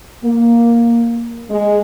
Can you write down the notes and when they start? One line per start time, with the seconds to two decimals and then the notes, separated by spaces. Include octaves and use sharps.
0.23 A#3
1.50 G#3